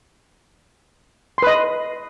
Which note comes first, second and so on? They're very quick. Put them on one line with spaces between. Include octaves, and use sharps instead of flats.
C6 B4 D#5